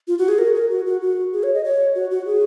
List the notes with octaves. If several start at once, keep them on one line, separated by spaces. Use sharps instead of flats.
F4
F#4
G#4
A#4
A#4
F#4
F#4
F#4
G#4
C#5
D#5
C#5
F#4
F#4
G#4